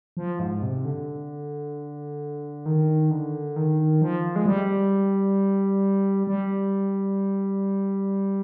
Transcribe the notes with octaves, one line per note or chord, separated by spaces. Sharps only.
F3
G#2
C3
D3
D#3
D3
D#3
F3
G#3
G3
G3